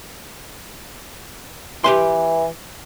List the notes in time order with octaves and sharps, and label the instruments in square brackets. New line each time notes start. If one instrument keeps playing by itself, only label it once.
[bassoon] E3 [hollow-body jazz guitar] G4 B4 C6